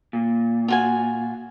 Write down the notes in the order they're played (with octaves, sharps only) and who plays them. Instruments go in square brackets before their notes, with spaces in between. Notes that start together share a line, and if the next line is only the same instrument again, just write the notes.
[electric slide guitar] A#2
[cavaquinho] F4 F#4 G#5